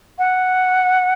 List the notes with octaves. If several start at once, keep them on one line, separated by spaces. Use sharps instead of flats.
F#5